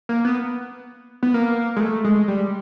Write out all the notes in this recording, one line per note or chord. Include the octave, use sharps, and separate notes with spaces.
A#3
B3
B3
A#3
G#3
A3
G#3
G3